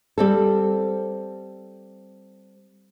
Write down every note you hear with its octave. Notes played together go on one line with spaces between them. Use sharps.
G3 C4 A4